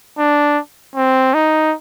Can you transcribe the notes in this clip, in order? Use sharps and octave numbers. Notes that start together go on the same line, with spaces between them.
D4
C4
D#4